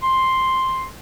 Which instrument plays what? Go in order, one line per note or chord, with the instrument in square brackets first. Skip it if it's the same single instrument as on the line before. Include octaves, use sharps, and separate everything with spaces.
[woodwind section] C6